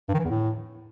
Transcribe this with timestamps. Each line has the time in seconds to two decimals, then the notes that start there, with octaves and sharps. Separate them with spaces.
0.08 G2
0.14 D#3
0.19 E3
0.25 E2
0.30 A2